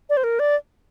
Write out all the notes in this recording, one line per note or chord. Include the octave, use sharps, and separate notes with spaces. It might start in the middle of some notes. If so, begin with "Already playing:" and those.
D5
C5
A#4
D5